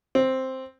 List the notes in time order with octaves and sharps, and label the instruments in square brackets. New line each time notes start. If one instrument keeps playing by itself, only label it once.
[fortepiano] C4